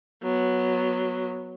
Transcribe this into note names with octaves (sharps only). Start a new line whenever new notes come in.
F#3 B3